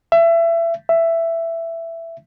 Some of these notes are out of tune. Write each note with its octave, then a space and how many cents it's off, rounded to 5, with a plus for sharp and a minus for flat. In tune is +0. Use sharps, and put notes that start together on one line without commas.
E5 +25
E5 +10